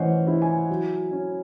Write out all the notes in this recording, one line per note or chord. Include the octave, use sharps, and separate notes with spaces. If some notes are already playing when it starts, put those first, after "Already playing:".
Already playing: E3 A3 C#4 C5 C#5 D#5 F#5
E4
G#5
F#3
C#4